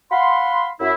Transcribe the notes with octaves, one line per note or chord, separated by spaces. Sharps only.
F5 F#5 B5 C6
F#2 E4